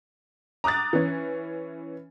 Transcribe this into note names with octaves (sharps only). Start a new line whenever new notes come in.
A#5 D6 D#6 F#6 A6
E3 C#4